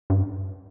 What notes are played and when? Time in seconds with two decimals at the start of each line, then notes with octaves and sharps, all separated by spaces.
0.10 G2